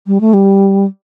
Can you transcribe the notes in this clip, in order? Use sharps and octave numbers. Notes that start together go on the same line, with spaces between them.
G3
A3
G3